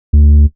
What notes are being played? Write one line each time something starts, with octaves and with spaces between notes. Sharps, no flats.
D2